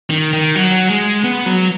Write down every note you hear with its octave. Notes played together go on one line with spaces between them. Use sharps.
D#3
D#3
F#3
G#3
B3
F#3